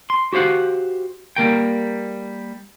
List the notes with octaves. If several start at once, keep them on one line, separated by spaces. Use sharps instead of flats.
C6
F#4 G4 C5 F5 F#5
G3 A#3 A#4 G5